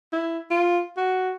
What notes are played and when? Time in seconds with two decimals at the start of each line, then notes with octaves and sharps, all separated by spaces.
0.13 E4
0.51 F4
0.97 F#4